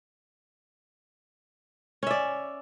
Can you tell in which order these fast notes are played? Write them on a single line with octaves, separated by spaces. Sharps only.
C#4 E5 D5